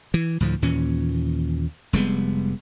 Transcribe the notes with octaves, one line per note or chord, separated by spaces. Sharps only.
E3
D2 A2 F3
D#2 A#2 E3 C#4
F1 G3 G#3 B3